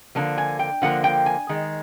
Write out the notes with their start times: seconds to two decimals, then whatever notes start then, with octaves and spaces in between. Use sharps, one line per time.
0.15 D3 F3 A#3 A5
0.38 G#5
0.59 G5
0.82 D3 F3 A#3 F#5
1.04 G5
1.26 G#5
1.49 D#3 G#3